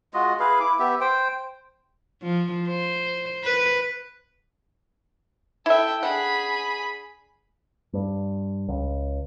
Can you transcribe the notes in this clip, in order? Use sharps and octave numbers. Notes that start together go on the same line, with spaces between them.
G#3 F4 F#4 D#5
E4 G#4 B4 F5
E4 D6
B3 G4 E5
C5 G5
F3
C5
B4
E4 A4 E5 G5
D4 G#4 F#5 B5
G2
C#2